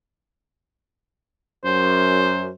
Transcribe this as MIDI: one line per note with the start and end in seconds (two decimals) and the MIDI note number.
1.65 2.49 42
1.65 2.51 72